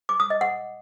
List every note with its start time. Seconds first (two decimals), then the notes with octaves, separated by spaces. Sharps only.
0.09 D6
0.20 D#6
0.30 D#5
0.41 F#5